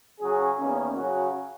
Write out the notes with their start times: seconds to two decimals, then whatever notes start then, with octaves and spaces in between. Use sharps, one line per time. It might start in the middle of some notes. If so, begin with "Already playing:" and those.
0.20 C#3 F#3 C#4 G#4
0.57 E2 D#3 A#3 C#4
0.96 C#3 F#3 C#4 F#4